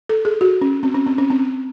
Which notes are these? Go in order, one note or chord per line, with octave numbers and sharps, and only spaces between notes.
A4
G#4
F#4
C#4
C4
C#4
C4
C#4
C4